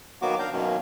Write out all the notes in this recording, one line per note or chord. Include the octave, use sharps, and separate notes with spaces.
D#3 F#3 A#3 B3 F#4 D6
D4 F5 A#5 G6
F#2 B2 D#3 F#3 A#3 C#4